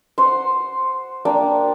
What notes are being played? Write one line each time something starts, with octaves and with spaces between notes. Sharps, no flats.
C5 F#5 C6
A#3 D4 G5